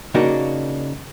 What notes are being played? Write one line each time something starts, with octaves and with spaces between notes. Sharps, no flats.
C#3 A#3 D4 D#4 F#4